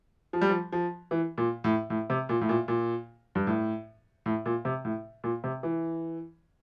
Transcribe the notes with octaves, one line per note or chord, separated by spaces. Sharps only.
F3
G3
F3
F3
E3
A#2
A2
A2
C3
A#2
A2
A#2
A#2
G2
A2
A2
A#2
C3
A2
A#2
C3
E3